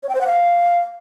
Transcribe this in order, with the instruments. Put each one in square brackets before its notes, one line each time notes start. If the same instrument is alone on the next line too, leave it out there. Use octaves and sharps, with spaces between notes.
[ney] C#5
G5
C5
F#5
F5